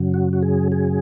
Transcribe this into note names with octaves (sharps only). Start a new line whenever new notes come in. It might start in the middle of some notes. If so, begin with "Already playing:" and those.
Already playing: F#2 C#3 F#3
F#4
F#4
G#4
G#4